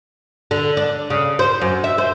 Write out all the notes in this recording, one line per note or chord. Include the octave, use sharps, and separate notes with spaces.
D3
D4
C#3
C5
F#2
E5
C5